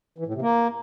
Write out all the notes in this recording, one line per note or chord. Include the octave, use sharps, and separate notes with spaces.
E3
A2
C3
A#3